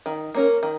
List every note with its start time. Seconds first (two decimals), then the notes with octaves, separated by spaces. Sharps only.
0.06 D#3
0.35 A#3 C#4 A#4
0.63 D#3